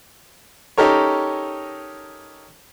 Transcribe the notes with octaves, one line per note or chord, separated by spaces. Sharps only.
C#4 D#4 G4 A4 A#4 C#5